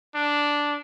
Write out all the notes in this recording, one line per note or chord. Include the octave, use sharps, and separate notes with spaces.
D4